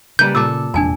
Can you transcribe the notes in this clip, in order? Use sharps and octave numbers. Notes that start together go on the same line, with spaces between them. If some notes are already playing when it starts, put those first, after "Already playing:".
C#3 G3 A#3 B4 G6
A#2 A4 A5 D6 E6
F1 E2 G#3 D4 G#5 A5